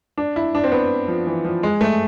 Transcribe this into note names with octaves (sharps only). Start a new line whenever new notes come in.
D4
E4
D4
C4
B3
F3
E3
F3
G#3
A3